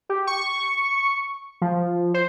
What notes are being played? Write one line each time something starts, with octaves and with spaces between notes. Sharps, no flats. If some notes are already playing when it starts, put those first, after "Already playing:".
G4
C#6
F3
C5